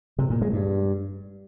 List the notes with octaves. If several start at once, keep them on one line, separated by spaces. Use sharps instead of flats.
C3
A#2
G#3
G2